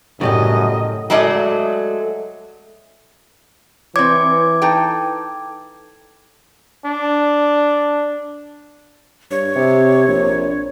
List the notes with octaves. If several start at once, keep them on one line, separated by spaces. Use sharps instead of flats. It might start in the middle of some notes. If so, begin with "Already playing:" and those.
F#2 A2 C#3 G3 G4 D#5
F#3 G#3 A3 D5 D#5
E3 C4 C#5 D6 G#6
D#4 A4 G5
D4
G2 C#5
C3
A#1